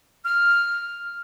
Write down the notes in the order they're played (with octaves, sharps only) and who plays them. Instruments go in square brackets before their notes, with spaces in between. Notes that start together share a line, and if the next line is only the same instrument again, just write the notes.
[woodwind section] F6